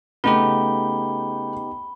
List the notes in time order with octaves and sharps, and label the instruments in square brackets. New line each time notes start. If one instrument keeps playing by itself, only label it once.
[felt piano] C#3 A3 [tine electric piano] B3 D#4 G4 [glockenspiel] B5 G7